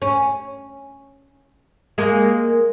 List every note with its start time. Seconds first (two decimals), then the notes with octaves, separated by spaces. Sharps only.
0.02 C#4
1.98 G#3 A#3 A#4